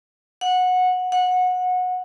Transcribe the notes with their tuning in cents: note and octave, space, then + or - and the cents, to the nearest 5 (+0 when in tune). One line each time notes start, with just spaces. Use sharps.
F#5 -15
F#5 -20